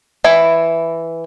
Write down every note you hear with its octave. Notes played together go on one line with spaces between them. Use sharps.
E3 E4